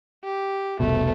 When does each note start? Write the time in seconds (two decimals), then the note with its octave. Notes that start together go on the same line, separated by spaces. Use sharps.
0.24 G4
0.80 F1 C2 B2 A3